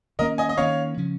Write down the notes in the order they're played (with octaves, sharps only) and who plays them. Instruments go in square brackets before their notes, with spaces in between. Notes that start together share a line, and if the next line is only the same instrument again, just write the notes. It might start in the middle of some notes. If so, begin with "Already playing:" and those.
[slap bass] D#3 A#3 C#4 [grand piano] A#4 D#5
[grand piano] D#5 G#5
D#5
[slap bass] D#3 A#3 C#4 [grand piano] C#5 F5
[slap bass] C#3 F3 C#4